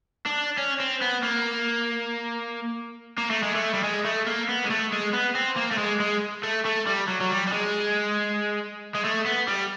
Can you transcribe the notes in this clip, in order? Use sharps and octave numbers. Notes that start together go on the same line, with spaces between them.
D4
C#4
C4
B3
A#3
A#3
A3
G#3
A3
G3
G#3
A3
A#3
B3
G#3
A3
G#3
B3
C4
A#3
A3
G#3
G#3
A3
A3
G3
F#3
F#3
G3
G3
G#3
G#3
A3
B3
G3